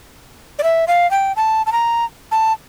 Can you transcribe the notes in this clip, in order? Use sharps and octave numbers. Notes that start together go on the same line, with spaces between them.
D5
E5
F5
G5
A5
A5
A#5
A5